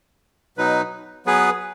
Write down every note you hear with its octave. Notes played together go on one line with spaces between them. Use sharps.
B2 F#3 D#4 B4
F#3 B3 G#4 B4